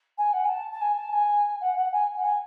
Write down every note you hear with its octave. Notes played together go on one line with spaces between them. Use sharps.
G#5
F#5
G#5
A5
A5
G#5
A5
G#5
F#5
F#5
G#5
F#5
G#5